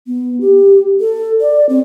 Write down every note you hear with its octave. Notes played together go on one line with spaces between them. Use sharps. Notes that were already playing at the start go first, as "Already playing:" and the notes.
B3
G4
A4
D5
C4